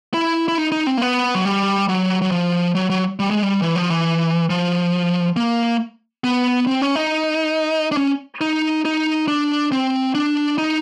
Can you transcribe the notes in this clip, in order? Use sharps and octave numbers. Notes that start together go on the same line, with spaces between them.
E4
E4
D#4
D#4
C4
A#3
B3
F#3
G3
F#3
F#3
F3
F#3
F#3
G3
G#3
G3
E3
F3
E3
F3
A#3
B3
C4
C#4
D#4
D4
C#4
D#4
D#4
D4
C4
D4
D#4